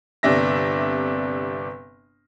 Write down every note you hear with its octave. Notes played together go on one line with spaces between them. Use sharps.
G1 C3 D4 E5 A#6